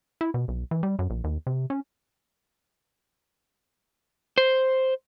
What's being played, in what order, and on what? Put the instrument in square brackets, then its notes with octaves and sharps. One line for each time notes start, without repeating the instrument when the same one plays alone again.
[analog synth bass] E4
B2
B1
E3
G3
F#2
A#1
D#2
C3
C#4
[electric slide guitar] C5